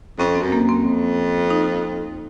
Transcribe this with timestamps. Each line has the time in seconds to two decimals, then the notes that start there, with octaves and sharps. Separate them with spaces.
0.19 F2 C#4
0.35 C4
0.42 F#2
0.52 A#3
0.63 F#2
0.69 C4
0.85 F2
1.50 D#4